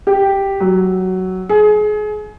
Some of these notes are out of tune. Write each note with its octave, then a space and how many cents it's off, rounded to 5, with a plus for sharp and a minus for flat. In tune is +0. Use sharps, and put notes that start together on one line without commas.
G4 +0
F#3 +10
G#4 +30